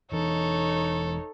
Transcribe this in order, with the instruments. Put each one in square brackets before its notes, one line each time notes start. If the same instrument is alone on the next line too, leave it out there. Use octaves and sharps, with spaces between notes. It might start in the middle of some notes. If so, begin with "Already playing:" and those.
[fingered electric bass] E1 E3 [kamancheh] D#4 C#5 [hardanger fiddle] A4